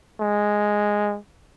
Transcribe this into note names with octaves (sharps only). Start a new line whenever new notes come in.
G#3